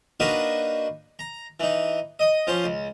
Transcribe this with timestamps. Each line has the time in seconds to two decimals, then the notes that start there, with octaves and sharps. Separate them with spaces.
0.20 A#3 D4 D#4 F#4 A#4 B4
1.19 A#5
1.60 E3 D#4
2.19 D#5 D#6
2.47 F3 C#4 C5
2.64 C#2